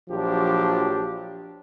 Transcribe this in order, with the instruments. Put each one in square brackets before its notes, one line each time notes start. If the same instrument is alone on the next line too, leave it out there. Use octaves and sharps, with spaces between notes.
[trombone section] A#1 F3 F#3 D4 G4